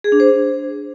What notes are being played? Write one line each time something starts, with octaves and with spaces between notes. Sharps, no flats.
G#4
D4
C5